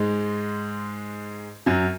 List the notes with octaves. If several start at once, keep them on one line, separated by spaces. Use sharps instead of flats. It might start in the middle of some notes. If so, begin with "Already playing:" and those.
Already playing: G#2 G#3
F#2 F#3